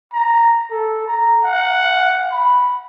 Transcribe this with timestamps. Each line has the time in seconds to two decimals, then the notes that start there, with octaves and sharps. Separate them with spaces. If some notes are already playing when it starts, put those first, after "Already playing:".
0.13 A#5
0.71 A4
1.07 A#5
1.44 F#5
2.31 B5